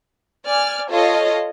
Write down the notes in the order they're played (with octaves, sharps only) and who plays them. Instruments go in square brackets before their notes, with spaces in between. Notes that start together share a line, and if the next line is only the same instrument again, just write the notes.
[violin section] D5 G#5 F6
F4 A4 C#5 D#5 F5